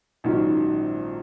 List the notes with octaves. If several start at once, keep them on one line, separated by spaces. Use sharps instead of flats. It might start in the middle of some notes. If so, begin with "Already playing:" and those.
A#1 G#2 D#3 F#3 C#4